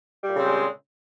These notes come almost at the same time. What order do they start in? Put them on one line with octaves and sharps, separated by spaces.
G3 A#2 C#3 C4 G#3